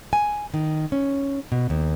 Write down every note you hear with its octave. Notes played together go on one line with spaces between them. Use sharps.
G#5
D#3
C#4
B2
D#2